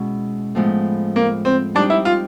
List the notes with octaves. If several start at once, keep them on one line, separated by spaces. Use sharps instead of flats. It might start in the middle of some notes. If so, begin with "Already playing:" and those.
Already playing: B2 G#3 C#4 E4
A2 F3 G#3 B3
A#3
C4
G3 C4 D4 D#4 G4
E4
F4